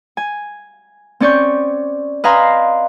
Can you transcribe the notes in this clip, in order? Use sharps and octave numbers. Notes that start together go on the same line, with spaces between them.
G#5
C4 C#4 D5 C#6 G6
B4 D#5 F5 G#5 A#5 C6